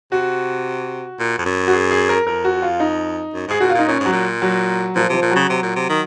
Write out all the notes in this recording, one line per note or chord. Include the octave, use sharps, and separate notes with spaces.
C3 F#4
A#2
F2
F#2
F#4
G#4
G#4
A#4
F2 A#4
F#4
F4
D#4
F#2
G#2 G#4
A#2 F#4
F4
A#2 D#4
A#2 C#4
G#2
F#3
A#2
F#3
A#2 F3
C3 F3
A#2
C#3 F#3
C3
A#2
C3
D#3